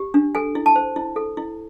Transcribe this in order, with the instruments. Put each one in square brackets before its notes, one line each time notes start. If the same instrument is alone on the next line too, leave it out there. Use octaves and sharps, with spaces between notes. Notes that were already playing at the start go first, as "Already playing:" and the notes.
Already playing: [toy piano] G4
D4
A4 G#5
E4
A5
C5
E4
A4
E4